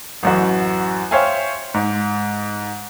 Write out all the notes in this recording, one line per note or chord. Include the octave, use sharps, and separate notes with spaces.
A1 F#2 F#4
C5 C#5 E5 F5 G5 G#5
G#2